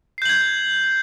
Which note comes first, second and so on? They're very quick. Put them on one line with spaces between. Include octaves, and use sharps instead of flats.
C7 G6 F#7 G#6